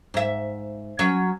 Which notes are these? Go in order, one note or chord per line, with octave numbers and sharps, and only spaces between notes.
G#2 E5
F#3 C#4